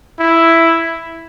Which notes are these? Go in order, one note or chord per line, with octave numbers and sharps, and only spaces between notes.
E4